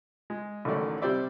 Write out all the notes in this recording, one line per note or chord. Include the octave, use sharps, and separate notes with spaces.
G#3
A1 D3 D#3 F#3 A3 D5
C3 G3 C5 D5 E5